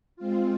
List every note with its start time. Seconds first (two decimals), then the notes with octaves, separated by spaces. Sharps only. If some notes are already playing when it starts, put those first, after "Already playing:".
0.16 G#3 C4 F4